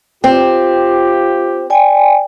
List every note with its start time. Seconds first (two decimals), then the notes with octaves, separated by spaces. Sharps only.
0.24 C4 F4 G4
1.70 D5 G5 G#5